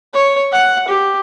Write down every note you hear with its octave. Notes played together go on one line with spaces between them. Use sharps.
C#5
F#5
G4